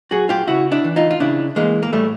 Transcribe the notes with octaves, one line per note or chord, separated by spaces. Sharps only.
F#3 F#4 G#4
F4 G4
C#3 E4 F#4
D4 E4
E3
D#4 F4
F4
C#3 D4 E4
E3 G#3 A#3
A#3
A2 G3 A3